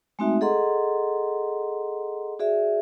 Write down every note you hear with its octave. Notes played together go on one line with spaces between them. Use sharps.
G#3 A3 C4 D#4 F#4 E5
G#4 A4 D#5 F#5 A#5 C6
F#4 G#4 D5 E5